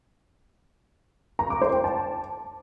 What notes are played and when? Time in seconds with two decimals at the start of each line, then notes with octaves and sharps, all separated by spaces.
1.39 A#5
1.50 D6
1.62 C5
1.73 G5
1.84 A5